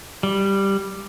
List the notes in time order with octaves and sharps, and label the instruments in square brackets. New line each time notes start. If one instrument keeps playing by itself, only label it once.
[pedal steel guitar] G3